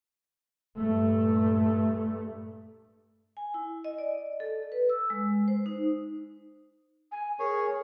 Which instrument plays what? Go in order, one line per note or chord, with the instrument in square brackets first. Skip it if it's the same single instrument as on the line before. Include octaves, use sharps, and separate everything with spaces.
[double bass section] G2 A#2 A3
[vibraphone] G#5
E4
D#5
D5
A4
B4
E6
G#3
C5
D#4
[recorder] G#5
[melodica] G#4 C#5 [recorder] A#4